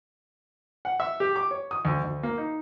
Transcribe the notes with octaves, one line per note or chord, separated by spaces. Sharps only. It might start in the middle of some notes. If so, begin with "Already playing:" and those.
F#5
E5
G4
D6
C#5
D#6
D2
D2
A#3
D#4